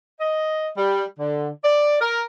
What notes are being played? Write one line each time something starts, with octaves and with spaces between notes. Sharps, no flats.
D#5
G3
D3
D5
A#4